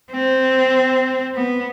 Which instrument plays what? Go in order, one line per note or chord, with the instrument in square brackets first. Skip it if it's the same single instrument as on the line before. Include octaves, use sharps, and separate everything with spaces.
[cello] C4
B3